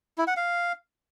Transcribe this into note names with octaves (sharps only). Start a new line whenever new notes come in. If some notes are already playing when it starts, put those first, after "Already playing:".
E4
F#5
F5